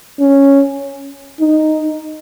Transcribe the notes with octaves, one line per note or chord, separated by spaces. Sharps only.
C#4
D#4